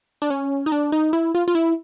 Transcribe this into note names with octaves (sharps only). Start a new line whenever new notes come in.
D4
C#4
D#4
D4
D#4
E4
F4
F4
E4